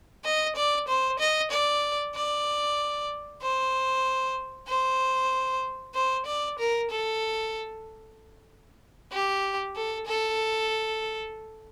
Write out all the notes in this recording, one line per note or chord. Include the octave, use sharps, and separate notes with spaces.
D#5
D5
C5
D#5
D5
D5
C5
C5
C5
D5
A#4
A4
G4
A4
A4